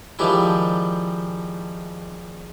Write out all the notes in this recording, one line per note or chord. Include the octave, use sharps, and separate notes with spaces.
D#3 F3 G3 G#3 D4 E4